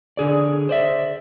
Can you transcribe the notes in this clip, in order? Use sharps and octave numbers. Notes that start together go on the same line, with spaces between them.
D3 G#4 D5
C5 D5 E5